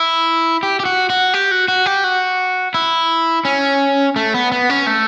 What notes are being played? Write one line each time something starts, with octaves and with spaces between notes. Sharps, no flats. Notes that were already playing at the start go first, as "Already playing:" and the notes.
Already playing: E4
G4
G4
F#4
F#4
G4
F#4
F#4
G4
F#4
E4
C#4
A3
B3
B3
C#4
A3